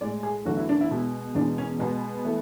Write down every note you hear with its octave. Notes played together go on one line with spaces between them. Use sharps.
A2 G#3 D5
G#4
E2 D3 F#3 A3 F#4
E4
D4
E4
B2 G#3
E2 B2 G#3 D4
C#4
B2 G#3 B3
E3 A3